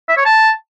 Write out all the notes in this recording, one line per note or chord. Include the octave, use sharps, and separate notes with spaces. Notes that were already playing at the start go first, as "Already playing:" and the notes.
E5
C#5
A5